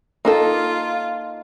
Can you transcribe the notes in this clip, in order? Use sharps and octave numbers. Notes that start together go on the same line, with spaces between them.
A#3 D#4 F4 A4